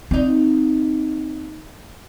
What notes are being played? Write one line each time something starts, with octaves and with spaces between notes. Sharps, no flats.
D#2 C4 D#4